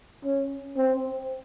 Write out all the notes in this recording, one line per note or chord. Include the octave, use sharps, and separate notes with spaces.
C#4
C4